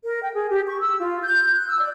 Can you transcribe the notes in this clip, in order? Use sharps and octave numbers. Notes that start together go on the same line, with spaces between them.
A#4
G5
G#4
G4
C#6
E6
F4
G6
F#6
E6
D5